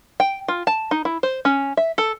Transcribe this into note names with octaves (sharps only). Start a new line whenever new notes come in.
G5
F4
A5
D#4
E4
C5
C#4
E5
A4